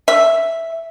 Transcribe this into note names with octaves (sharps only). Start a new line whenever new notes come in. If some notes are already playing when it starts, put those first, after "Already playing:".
E5